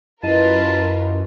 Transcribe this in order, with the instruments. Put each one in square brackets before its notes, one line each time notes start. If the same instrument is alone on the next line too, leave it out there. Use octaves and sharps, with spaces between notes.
[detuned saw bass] F#2 [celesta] E4 D#5 D#7 [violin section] F4 A#4 B4 [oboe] A5